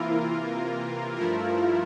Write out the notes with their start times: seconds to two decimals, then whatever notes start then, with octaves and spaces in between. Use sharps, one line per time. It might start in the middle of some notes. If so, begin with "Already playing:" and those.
Already playing: C3 E3 A#3 E4 F4 A#4
1.16 G2 F3 A3 E4 F4 A#4